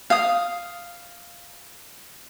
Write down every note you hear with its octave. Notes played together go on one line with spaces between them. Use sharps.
F5 D#6